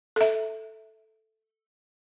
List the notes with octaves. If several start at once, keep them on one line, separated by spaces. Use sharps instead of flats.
A4 E5